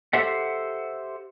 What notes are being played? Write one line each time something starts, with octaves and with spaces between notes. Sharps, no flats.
G4 A4 C5 E5 F#5